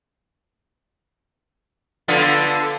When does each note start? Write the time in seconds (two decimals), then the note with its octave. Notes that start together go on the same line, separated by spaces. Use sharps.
2.08 D3 B3 F4